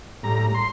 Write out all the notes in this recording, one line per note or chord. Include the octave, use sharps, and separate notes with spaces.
A2 G3 A#5
C6